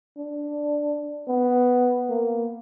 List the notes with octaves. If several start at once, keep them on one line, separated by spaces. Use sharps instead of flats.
D4
B3
A#3